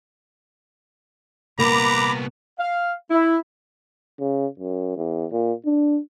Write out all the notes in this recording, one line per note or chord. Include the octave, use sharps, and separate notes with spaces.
C2 A#3 B3 A#5 B5 D6
F5
E4
C#3
F#2
E2
A#2
D4